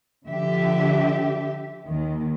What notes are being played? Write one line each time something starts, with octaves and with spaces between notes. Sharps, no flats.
D3 F3 G4 E5
D#2 D#3